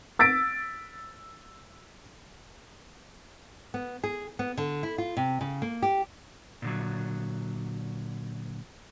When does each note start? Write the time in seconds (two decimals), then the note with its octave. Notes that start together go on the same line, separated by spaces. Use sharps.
0.19 E6 A6 B6 D7
3.74 B3
4.04 G#4
4.39 B3
4.57 D3
4.83 E4
4.98 F4
5.17 C3
5.41 C#3
5.62 A#3
5.82 G4
6.62 A#2 D3 F#3